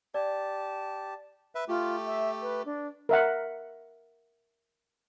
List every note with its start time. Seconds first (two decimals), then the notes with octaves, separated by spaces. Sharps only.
0.14 G4 D5 A5
1.55 B4 E5
1.68 A3 F4 G4
2.06 E5
2.42 B4
2.65 D4
3.09 A#4 E5 F#5